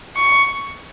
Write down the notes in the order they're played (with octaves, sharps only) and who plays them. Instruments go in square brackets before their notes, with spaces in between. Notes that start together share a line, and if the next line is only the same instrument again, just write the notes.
[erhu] C#6